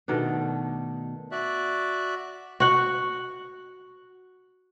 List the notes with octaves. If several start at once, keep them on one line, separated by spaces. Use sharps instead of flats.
B2 D#3 A3 D4
F#4 D5 E5 F#6
F#4 F#5